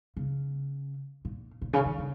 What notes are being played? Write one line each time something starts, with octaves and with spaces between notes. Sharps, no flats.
C#3
A#2
A#2
C#3
D#3
C#3